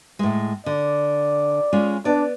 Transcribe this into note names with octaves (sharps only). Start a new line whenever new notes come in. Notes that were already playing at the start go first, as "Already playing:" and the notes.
A2 G#3
D3 D5
G#3 C#4 F4
B3 D4 D5